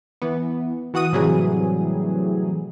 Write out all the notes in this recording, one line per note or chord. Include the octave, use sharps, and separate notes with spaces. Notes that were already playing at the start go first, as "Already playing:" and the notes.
E3 B3
E3 F#4 F#5 D#6 D#7
A2 C3 E3 F#3 G3 G#4